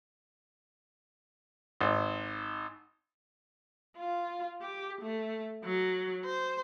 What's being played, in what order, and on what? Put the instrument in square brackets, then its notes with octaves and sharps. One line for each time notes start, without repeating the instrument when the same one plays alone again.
[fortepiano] G#1
[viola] F4
G4
A3
F#3
C5